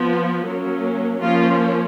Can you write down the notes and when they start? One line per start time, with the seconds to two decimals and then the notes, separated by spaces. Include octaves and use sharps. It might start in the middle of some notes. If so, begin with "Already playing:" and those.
Already playing: F3 B3
0.44 F#3 A#3 C#4
1.21 F3 A#3 C#4 F4